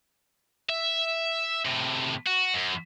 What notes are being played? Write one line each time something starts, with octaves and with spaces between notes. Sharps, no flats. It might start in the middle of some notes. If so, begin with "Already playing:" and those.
E5
A2 C3
F#4
F#2